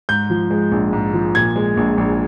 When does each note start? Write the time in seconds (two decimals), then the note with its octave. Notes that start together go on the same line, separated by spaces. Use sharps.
0.09 G#2 G6
0.30 F3
0.51 G#3
0.72 A#1
0.93 G#2
1.13 F3
1.35 A#2 G#6
1.56 G#3
1.77 A#1
1.98 A#1